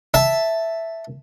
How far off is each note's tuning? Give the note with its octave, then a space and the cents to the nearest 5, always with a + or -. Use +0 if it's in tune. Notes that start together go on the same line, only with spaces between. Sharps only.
E5 +0 A5 +0